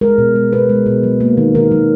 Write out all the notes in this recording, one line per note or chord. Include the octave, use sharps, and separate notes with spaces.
G#3 A#4
B2
G#3
B2 B4
G#3
B2
F#3
A#3
D#3
D#3 A#4
F#3